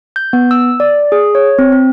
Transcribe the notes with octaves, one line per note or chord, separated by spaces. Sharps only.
G6
B3
E6
D5
G#4
C#5
C4
C4